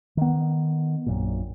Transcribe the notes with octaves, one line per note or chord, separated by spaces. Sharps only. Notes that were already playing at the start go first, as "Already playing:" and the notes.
D#3 B3
A#1 F#2 A#2